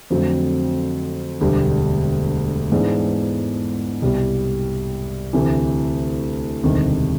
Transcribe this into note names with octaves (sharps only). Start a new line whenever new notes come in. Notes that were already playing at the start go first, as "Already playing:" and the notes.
F2 D3 F#3 A3 C4
E1 D2 D3 G3
G#2 E3 G#3 B3 D4
C2 B2 G3
D2 C3 E3
E1 D2 C3 D#3 G3